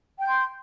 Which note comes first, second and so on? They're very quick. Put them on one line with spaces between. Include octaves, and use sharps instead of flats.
G5 G6 C6